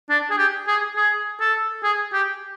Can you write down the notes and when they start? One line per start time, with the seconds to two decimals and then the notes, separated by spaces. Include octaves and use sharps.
0.09 D4
0.30 G#4
0.38 G4
0.67 G#4
0.96 G#4
1.40 A4
1.83 G#4
2.13 G4